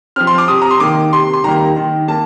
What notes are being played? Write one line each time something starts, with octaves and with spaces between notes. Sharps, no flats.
F3 C4 F6
C6
D6
C3 D#6
A#5
C6
D#3 A#3 D6
C3 C6
C6
D#3 G3 A#3 A#5
D#3
A#3 A5